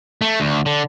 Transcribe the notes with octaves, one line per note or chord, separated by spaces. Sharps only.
A3
D2
D3